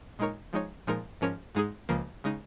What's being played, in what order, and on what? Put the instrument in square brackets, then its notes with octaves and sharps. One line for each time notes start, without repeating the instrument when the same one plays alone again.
[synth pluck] A#2 G#3 D#4 A#4 C#5
F3 G#3 D#4 C#5
A#2 F3 G#3 D#4 A#4
G#2 F3 C#4 A#4 C#5
G#2 G#3 D#4 G#4
C#2 C#3 F3 A#3
C#3 G#3 D#4